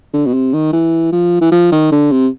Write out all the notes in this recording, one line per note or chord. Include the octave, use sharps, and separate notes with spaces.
D3
B2
C3
D#3
E3
F3
E3
F3
D#3
D3
C3